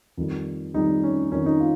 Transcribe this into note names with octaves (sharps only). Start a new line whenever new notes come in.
F2 D#3 G3
F2 D#3 G3 D#4
C#4
F2 D#3 G3 C#4
D#4
F4